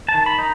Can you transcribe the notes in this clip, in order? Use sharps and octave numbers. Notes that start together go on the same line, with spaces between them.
A5
D#3
B5
D#4